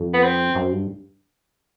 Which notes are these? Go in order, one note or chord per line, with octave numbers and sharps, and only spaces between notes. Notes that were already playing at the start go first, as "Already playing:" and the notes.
Already playing: F2
B3
C4
F#2
G2